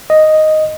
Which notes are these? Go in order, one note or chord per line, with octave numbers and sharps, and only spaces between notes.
D#5